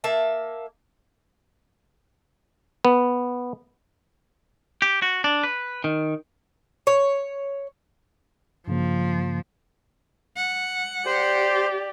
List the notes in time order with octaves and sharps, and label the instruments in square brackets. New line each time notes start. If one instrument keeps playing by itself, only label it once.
[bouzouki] A#3 E5 A5
[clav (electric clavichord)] B3
[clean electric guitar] G4
F#4
D4
B4
D#3
[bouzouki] C#5
[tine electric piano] G2 C#3 A#3 [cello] F3
[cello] F#5
[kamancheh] G4 D5 [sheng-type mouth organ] C5